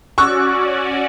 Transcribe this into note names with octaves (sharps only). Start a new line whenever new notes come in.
C#4 F#4 D5 C#6 E6 F#6